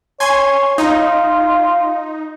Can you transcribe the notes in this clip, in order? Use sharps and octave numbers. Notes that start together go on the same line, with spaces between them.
C#5 G#5 C6 G#6
D#4 F4